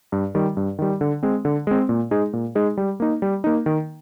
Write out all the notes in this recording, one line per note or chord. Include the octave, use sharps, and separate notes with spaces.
G2
D#3 G3
G2
D#3 G3
D3
G#3 C4
D3
G#3 C4
A#2
G#3 D#4 G#4
A#2
G#3 D#4 G#4
G3
A#3 D#4
G3
A#3 D#4
D#3